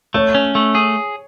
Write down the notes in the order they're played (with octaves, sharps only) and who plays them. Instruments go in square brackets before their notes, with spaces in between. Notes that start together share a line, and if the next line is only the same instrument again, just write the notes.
[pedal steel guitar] A3 [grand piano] C#5
[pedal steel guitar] C#4
A3
G#4